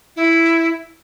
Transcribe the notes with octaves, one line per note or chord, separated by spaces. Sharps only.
E4